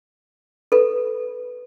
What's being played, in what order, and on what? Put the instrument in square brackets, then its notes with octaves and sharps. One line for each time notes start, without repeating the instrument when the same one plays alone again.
[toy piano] A4 B4